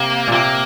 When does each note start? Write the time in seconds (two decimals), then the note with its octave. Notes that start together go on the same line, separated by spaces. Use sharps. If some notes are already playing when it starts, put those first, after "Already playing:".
Already playing: C3 A#3
0.28 A#2
0.32 C3 A#3